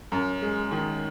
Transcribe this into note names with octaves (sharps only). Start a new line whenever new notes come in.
F#2
G#3
D#3